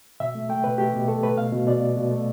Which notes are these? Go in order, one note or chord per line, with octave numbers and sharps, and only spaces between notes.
B2 E5
A3
A3 G5
B2 B4
A3 G4
B2
A3 A4
A3 B4
B2 F5
B2
B2 D5
B2
B2
A3